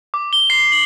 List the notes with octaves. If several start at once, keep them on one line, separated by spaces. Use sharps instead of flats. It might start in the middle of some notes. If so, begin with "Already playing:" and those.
D6
G7
C7
F#7